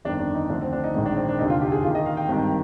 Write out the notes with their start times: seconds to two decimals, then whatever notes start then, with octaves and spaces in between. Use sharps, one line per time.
0.05 G1 F2 D#3 D4
0.19 D4
0.35 D#4
0.49 D2 D3 F3 D4
0.61 C4
0.73 D4
0.84 D#4
0.94 A#1 G#2 D#3 D#4
1.06 D4
1.17 C4
1.28 D4
1.39 F1 D#2 D3 D#4
1.50 F4
1.61 G4
1.72 G#4
1.83 D#2 D#3 F4
1.95 D#5
2.06 F5
2.17 G5
2.29 G#1 G2 D#3